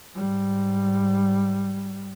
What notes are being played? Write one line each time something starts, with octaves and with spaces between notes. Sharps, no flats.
G#2 G3